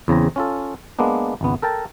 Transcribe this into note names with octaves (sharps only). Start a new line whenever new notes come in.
E2 C#3 C4 A#5
C#4 F4 A4
G#3 A#3 B3 D4
G#1 C#2 B3
A4 A#4 G5 A5